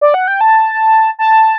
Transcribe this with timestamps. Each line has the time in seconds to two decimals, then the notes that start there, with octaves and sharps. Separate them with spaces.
0.01 D5
0.14 F#5
0.28 G5
0.41 A5
1.19 A5